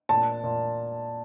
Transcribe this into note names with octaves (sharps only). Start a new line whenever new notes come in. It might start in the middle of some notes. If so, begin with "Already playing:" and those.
A#2 A5
A#2